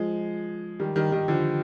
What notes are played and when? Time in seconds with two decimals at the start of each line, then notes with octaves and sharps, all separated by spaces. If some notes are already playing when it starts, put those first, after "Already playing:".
Already playing: F3 G#3
0.80 D#3 G3
0.96 D#3 G3
1.12 D#3 G3
1.28 D3 F3